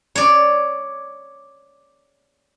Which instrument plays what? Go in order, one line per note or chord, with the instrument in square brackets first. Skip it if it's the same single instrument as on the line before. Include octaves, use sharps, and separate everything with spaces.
[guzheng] C#5 D5